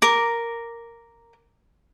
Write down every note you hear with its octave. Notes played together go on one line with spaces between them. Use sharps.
A#4 D6